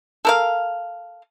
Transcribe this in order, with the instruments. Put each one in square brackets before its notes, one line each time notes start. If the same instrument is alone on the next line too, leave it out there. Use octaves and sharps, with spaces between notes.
[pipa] A4 A#4 F5